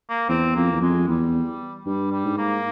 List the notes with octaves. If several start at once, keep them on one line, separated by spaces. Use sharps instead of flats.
A#3
E2 C4
F2 A#3
E2
F2 G#3
E2 G3
G2 G3
G3
G#2
A#3